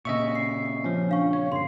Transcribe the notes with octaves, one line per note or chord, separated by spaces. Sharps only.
A#2 C#3 D#5 E5 C#6
C7
F3 C#4
D4 F5 C#6
C#5 C#6
G1 C6 C7